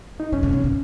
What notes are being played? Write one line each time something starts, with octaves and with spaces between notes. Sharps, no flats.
D#4
C3 C#4
C#3
C3
C#3